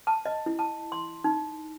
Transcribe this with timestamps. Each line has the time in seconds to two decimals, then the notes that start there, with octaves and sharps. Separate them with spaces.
0.07 A5
0.26 D#5
0.46 E4
0.59 A5
0.92 C6
1.24 D#4